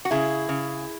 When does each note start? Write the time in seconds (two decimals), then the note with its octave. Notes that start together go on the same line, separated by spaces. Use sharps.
0.05 F#4
0.11 C#3 E4 G#4
0.49 C#3